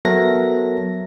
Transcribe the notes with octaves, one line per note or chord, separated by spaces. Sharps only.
F#3 B3 A4 A#4 E5 A#6